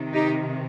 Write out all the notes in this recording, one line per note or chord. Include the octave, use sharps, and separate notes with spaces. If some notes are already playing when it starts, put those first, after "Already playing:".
Already playing: C3 D#3
D#4 G4